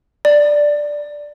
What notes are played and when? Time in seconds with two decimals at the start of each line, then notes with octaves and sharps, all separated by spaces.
0.25 D5